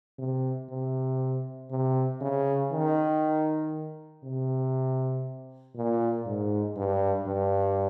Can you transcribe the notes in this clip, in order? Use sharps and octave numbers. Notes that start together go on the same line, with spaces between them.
C3
C3
C3
C#3
D#3
C3
A#2
G#2
G2
G2